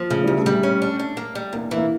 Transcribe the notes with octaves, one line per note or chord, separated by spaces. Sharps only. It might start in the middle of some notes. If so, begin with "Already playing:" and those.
Already playing: F3 A#3
C#3 A3
D2 G3
A3
G3
C#4
D4
D4
A#3
G3
E2 A#3
E3
A#3